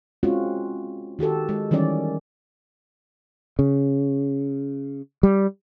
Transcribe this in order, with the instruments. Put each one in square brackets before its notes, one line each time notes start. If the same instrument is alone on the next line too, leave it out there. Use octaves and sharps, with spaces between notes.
[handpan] G#3 C4 C#4 F4 F#4
D#3 F#4 G4 A4
G#3
D#3 E3 G3 C#4 D5
[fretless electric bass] C#3
G3